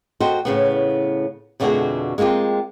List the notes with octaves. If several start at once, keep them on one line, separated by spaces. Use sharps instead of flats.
F#4 A4 C5 D#5 G5
A2 C#3 B3
F2 B2 D3 A3 F#4 G#4
G#3 A#3 C4 F4 G4